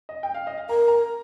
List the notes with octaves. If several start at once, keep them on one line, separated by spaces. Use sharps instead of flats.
D#5
G5
F5
D#5
F5
A#4 A#5
A#5